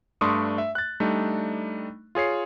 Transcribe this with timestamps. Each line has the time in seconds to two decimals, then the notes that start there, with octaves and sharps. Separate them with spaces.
0.21 G2 A3 D4 C6 C#6 D#6
0.58 E5
0.75 F#6 A6
1.00 G3 A3 D4 D#4
2.15 F4 G#4 C#5 C7